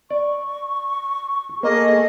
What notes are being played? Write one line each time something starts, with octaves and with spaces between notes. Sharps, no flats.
D5 C#6
A#3 G#4 A4 D#5